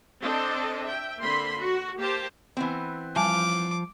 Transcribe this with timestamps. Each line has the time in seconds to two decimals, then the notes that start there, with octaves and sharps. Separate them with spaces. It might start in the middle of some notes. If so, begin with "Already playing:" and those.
0.22 C4 D4 A4 D#5
0.82 E5 G5
1.22 D3 A#3 C4 B5 C6
1.58 F#4
1.99 A#3 G4 C5 A5
2.57 E3 B3 C4
3.16 F3 G3 F5 G#5 A5 D6